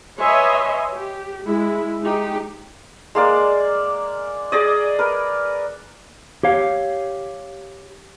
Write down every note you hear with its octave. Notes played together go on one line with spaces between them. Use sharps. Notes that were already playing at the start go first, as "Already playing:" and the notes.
B4 C#5 D#5 E5 G#5 C6
G4
G#3 E4
G#3 D#4 G4
G#3 A#3 D5
G#4 D5 D#5
A#4 B4
G4 C#5 F5